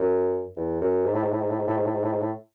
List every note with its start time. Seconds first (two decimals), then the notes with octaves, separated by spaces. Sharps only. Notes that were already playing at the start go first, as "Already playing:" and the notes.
Already playing: F#2
0.56 E2
0.81 F#2
1.05 G#2
1.14 A2
1.23 G#2
1.32 A2
1.41 G#2
1.50 A2
1.59 G#2
1.67 A2
1.77 G#2
1.86 A2
1.94 G#2
2.03 A2
2.12 G#2
2.21 A2